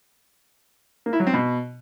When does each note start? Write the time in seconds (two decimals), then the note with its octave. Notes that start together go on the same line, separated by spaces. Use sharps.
1.06 A#3
1.13 E4
1.20 F#3
1.27 C4
1.34 B2